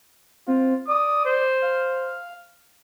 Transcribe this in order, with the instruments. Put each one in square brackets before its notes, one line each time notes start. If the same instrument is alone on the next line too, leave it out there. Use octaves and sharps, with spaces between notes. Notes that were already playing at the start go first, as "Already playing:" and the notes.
[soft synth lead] C4 [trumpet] F4
[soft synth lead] D5 [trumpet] D#6
[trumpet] C5
[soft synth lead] F5